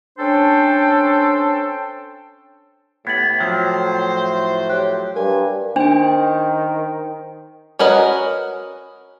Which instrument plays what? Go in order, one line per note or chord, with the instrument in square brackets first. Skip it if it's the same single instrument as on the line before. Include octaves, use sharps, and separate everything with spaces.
[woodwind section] C#4 D4 A4 C5 G5
[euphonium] A2 [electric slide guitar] B3 [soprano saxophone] G4 [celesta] G#6 F#7
[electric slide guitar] F3 F#3 [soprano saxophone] C5 [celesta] G5
[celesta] C6
[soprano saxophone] G4 [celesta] C#5 F#6
[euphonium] G2 [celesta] A#4 B4 [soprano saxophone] G#5
[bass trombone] D#3 [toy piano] D4 [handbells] C5 G5
[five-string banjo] C#4 F#4 A#4 B4 D#5